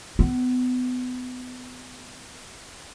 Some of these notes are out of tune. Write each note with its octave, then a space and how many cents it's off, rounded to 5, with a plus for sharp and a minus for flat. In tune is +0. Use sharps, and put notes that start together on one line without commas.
B3 +30